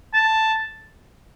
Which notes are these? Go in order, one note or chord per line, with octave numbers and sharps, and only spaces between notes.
A5